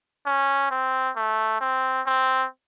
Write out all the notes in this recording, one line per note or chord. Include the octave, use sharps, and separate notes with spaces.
C#4
C4
A3
C4
C4